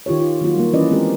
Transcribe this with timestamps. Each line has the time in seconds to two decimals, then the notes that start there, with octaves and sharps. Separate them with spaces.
0.06 D#3 F4 G4 C#5
0.20 F4
0.41 D#3 F#3 A#3 F4 F#4
0.56 G3 A#3
0.73 E3 C#4 B4 D5 D#5
0.91 G#3 C4 G4 A#4